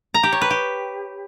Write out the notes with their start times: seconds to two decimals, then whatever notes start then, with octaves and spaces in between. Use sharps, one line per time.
0.14 A#5
0.23 G4
0.32 C#5
0.41 B4
0.50 G4